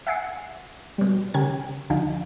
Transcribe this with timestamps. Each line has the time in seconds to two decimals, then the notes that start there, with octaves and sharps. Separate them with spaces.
0.07 E5 F#5 G#5 C7 C#7
0.98 B2 G3
1.34 C#3 C#4 G4 A#4 G#6
1.90 D2 D3 F3 D#4